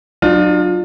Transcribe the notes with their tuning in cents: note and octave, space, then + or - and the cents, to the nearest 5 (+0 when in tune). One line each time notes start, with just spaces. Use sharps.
F#3 +0 D4 +40 F4 +20